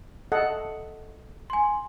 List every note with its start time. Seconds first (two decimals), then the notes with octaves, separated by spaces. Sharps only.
0.32 A4 D#5 F#5
1.50 G#5 C6